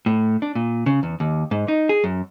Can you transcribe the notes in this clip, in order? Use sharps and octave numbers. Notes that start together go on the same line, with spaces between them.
A2
D4
A#2
C#3
E2
D#2
G#2
D#4
G#4
F#2